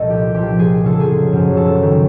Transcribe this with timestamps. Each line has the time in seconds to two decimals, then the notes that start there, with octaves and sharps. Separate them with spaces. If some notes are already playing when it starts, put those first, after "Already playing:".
Already playing: C2 A#2 F3 A4 D#5
0.10 G4
0.34 C2 A#2 F3 G4
0.59 G#4
0.81 F#2 C#3 F3 A4
1.00 G#4
1.32 F#2 C#3 F3
1.57 A4
1.82 D#3 F#3